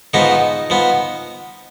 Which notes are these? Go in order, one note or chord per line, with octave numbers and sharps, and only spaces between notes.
G#2 F3 B3 D#4
F3 B3